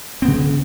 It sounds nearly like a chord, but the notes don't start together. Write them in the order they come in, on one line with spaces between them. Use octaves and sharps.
C4 B3 C#3